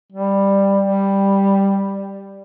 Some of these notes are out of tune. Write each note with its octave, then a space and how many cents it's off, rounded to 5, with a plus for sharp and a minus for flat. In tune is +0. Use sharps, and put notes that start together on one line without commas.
G3 +10
G3 +5